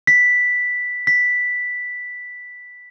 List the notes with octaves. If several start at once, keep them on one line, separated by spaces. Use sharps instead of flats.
B6
B6